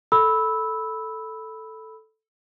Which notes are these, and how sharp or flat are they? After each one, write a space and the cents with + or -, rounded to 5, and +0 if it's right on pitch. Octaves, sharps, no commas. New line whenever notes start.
A4 +0 B5 +0 E6 -10